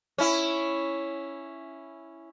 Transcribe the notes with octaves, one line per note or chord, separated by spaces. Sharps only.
C#4 E4